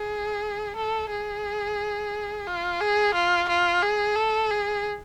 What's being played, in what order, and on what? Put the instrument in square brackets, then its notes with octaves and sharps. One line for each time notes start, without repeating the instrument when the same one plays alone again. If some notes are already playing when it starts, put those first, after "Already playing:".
Already playing: [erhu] G#4
A4
G#4
F4
G#4
F4
F4
G#4
A4
G#4